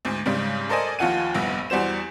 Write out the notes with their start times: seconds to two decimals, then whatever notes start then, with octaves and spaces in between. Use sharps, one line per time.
0.05 D2 G#2
0.26 G#2 C#3 G3
0.69 A4 A#4 C5 D5 D#5 G#5
0.99 D#2 F3 F4 F#5 G#5 D#7
1.35 F1 A#1 G2 B3
1.70 E2 G3 F#4 C5 E7